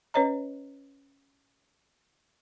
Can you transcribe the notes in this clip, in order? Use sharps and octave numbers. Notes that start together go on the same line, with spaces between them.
C#4 B4 C#5 D#5 A#5